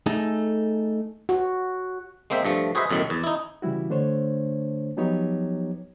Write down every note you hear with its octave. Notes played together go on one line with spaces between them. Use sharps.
A3 D#4 G#4 A4
F#4
G#3 A#3 C4 C5 E5
G2 F3 A3
F#4 G#4 B4 C5 D#5 E5
B1 F#2 A2 D#3
E2
D#4 E4
C#3 E3 G3 E4 F#4
D3 A3 D4 C5 C#5
F3 F#3 B3 D#4 G4 C#5